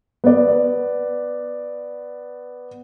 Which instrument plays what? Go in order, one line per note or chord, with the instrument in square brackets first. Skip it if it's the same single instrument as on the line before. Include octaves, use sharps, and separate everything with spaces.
[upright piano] B3 D5